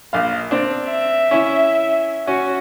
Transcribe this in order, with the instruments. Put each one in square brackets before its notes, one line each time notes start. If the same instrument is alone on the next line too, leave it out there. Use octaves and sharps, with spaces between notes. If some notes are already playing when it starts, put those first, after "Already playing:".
[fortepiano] A#1 F5
C4 D4
[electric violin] E5
[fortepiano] C#4 E4
[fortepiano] C#4 [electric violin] F#4